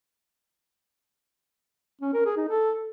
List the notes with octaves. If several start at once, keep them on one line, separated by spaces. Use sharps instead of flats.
C#4
A#4
G#4
D#4
A4